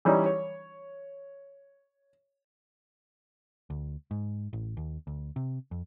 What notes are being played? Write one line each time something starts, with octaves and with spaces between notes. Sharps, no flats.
E3 G3 C#4 D#4
C#5
D2
G#2
A1
D#2
D2
C3
F2